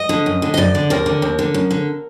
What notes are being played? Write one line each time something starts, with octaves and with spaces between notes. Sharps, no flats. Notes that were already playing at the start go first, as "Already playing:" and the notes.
Already playing: D#5
D3
F#2
D3
D#5
F#2 D5
D3
D#2 A#4
D3
D#2
D3
F#2
D3